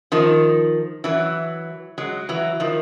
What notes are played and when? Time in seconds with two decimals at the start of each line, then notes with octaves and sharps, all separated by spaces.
0.12 D#3 F3
1.04 E3 F#3
1.98 F#3 G#3
2.29 E3 F#3
2.60 D#3 F3